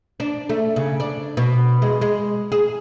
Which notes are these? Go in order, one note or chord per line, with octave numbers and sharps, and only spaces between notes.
D4
A3
C#3
D4
B2
G#3
G#3
G#4